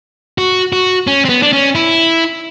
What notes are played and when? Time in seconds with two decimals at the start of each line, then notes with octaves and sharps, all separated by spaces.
0.38 F#4
0.73 F#4
1.07 C#4
1.25 C4
1.29 B3
1.42 D4
1.53 C#4
1.75 E4